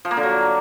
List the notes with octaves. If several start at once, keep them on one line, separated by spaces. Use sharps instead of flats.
F3
A#3
D3
F#3